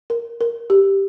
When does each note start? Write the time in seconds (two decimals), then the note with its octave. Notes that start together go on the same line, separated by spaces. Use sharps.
0.10 A#4
0.41 A#4
0.70 G4